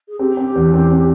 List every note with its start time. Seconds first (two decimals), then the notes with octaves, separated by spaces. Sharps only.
0.09 G#4
0.19 C4 G4
0.37 C4
0.56 E2
0.74 C4
0.91 C4